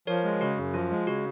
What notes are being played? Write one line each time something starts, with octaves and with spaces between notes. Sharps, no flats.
F3 A#4 C#5
G#3
C#3 F#4
F#2
F3 F4
G#3
C#3 F#4